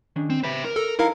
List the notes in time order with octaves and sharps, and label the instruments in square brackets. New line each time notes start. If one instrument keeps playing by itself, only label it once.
[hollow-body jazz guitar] D#3 C#4 D4
[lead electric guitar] C4
[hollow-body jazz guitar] B4 [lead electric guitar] C5 E5
[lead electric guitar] A#4
[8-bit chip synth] A4
[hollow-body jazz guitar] D#4 A4 A#5 [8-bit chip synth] E4 A#4 F5